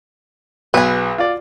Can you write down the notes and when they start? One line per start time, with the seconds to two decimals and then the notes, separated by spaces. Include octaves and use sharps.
0.74 B1 G#4 B4
1.18 F4 D5